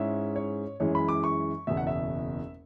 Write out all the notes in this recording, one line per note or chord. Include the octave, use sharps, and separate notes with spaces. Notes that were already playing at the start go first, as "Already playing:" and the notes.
Already playing: G#2 G#3 C#4 E4 E5
C#5
F#2 E3 G#3 C#5
B5
D6
C#6
F#1 E2 B2 E5
F#5
E5